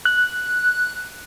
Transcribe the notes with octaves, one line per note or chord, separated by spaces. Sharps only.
F#6